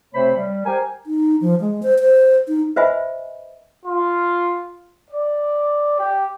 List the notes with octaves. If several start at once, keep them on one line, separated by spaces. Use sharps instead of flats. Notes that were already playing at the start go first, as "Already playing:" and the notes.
C3 A3 C4 C5 C#5 B5
G3
G4 A#4 C5 G5 G#5
D#4
F3
G#3
C5
C5
D#4
B4 C5 D#5 E5 G#5 B5
F4
D5
G4